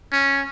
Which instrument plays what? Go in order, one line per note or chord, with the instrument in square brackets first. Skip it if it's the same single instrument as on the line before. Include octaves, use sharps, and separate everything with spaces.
[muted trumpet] C#4